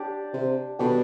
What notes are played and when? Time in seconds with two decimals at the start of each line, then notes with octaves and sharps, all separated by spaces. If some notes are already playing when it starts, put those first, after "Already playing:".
Already playing: D4 G4 D5
0.33 C3
0.79 B2 G3 D4 A4 D5